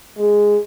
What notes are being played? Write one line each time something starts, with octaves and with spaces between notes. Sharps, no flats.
G#3